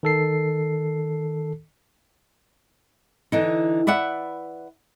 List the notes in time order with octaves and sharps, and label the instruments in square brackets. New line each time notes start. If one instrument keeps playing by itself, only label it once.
[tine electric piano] D#3 A4 C7
[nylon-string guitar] D3 E3 D#4
B4 D5 E5 F#5